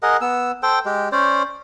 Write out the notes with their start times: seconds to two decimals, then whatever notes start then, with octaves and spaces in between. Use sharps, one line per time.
0.03 G#4 A#4 D#5 F#5
0.21 B3 E6
0.63 A4 C5 G5
0.86 G#3 G4
1.12 C#4 C5 D5